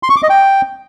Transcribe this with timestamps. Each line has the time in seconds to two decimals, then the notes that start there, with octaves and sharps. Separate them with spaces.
0.03 C6
0.10 C#6
0.16 D6
0.23 D#5
0.30 G5